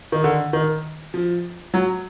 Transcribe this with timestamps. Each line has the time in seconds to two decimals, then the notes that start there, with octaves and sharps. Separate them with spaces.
0.12 D#3
0.24 D3
0.53 D#3
1.14 F3
1.74 F#3